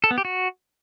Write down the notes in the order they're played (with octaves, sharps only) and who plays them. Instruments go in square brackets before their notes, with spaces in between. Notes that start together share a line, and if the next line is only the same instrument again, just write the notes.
[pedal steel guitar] A4
B3
G4
F#4